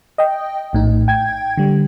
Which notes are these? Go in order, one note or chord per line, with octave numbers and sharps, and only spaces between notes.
D#5 G5
A#1 A2 D#4
G5 G#6
D3 G3